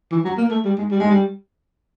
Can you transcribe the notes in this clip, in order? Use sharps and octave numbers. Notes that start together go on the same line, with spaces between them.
E3
F#3
A#3
A3
G3
G#3
G3
G#3
G3